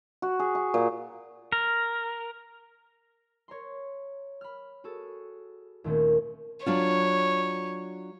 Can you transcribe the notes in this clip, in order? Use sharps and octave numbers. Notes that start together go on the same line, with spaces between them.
F#4
G#4
C#6
A#2
A#4
C#5 A#5 C6
B5 F6
F#4 G#4 A4
D#2 A#2 D#3 A3 C4 C#4
F#3 D4 F4 C#5